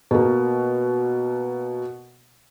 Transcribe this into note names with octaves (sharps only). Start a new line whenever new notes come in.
B2 A#3